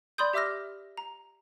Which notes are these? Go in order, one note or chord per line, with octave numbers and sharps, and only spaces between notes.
D5 B5 C6 D#6 G6
G4 E5 D6 E6 F6 A#6
A#5